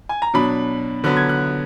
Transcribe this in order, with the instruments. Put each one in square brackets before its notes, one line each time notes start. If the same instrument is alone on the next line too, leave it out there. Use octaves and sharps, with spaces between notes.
[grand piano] G#5
A#5
B2 F#3 D4 B5
D3 F#3 B3 F#6
G#6
F#6